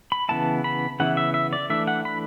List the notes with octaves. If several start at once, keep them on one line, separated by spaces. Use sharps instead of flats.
B5
C#3 E3 B3 E4 A5
B5
C#3 E3 B3 E4 F#5
E5
E5
D5
E3 A3 D4 E5
F#5
B5